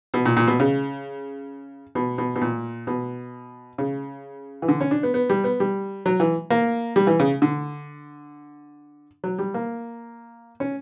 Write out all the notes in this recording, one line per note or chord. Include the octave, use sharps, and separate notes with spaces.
B2
A#2
A#2
B2
C#3
B2
B2
B2
A#2
B2
C#3
E3
D3
C#4
D4
B3
B3
G3
B3
G3
F#3
E3
A#3
G3
E3
C#3
D3
F#3
G3
A#3
C#4